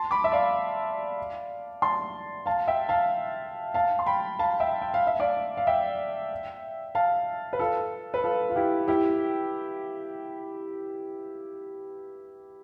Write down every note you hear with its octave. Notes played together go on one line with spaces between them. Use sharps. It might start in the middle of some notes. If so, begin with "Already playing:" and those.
Already playing: A5 C6
B5 D6
E5
D5 F5
A5 C6
F5 A5
E5 G5
F5 A5
F5 A5
C6
G5 B5
F5 A5
E5 G5
G5
F5
E5
D5 F5
F5
E5 G5
F5 A5
B4
F4 A4
B4
F4 A4
F4
E4 G4
E4 G4